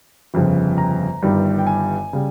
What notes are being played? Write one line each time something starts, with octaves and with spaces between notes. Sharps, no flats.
G1 F2 C#3 F3
A#5
G1 G2 D#3 G3
G5
G#5
C#3 G3